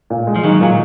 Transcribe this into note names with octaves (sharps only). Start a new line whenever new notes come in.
A#2
G#3
F3
D#3 F#3 D#4
A#2 F#3